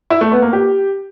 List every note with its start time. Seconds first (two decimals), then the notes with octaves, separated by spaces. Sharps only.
0.10 E4
0.21 A3
0.32 B3
0.42 A#3
0.53 G4